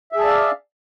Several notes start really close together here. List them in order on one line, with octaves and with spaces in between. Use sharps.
E5 G#4 A5 D5 F5